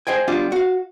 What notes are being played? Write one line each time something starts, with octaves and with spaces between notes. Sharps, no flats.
G#4 C5 D#5 G5 G#5
G3 B3 D4 F4
F#4 F5